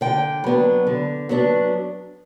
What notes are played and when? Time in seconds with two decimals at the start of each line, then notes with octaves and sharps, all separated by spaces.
0.01 D3 G5
0.44 F#3 B3 D4
0.87 D3
1.29 F#3 B3 D4